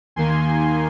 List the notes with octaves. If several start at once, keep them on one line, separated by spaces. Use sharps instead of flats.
D#2 D#3 A#3 G#5 C6